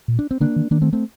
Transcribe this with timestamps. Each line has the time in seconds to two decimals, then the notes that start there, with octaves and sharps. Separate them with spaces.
0.08 A#2
0.19 D4
0.31 C4
0.41 D3 A#3 D4
0.56 D#3
0.71 D#3 A#3 D4
0.82 A3 C4
0.93 A3 C4